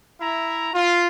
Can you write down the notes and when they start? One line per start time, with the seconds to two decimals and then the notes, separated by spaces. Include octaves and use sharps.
0.21 E4 E5 A#5
0.74 F4